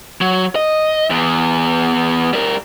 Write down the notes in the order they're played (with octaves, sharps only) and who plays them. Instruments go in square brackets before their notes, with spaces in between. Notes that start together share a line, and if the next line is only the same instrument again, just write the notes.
[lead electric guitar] F#3
D#5
E2
G3 A#4